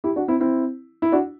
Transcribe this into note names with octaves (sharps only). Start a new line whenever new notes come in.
E4 G4
D4 F#4
C4 E4
C4 E4
E4
D4 F#4